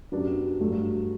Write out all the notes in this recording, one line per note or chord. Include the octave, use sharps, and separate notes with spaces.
F#2 F#3 B3 D4 G4
G2 F#3 A3